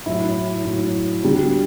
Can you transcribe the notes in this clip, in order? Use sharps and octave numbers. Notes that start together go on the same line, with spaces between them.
A2 F#3 E4
A2 F#3
D2 D3 G3